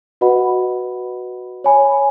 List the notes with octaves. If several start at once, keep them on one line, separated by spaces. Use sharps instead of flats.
F#4 B4 D#5 F#5 B5
C#5 G#5 B5